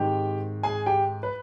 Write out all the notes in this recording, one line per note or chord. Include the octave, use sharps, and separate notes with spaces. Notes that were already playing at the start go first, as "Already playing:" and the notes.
Already playing: G#2 D#3 G#3 C4 G4 G5
G#4 G#5
G4 G5
B4